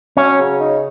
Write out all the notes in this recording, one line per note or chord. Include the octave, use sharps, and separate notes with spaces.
F#3 C#4
C#3
D#4